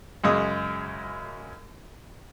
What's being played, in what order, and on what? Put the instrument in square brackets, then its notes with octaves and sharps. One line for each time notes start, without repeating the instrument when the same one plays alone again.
[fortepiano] F#2 C#3 G#3 D#6